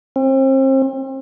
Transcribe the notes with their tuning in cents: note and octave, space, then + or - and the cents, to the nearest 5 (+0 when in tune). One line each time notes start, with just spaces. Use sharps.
C4 +35